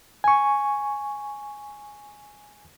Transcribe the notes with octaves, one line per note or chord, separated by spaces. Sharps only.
G#5 C#6